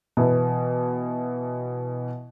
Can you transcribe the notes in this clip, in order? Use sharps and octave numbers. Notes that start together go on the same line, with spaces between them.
B2 E3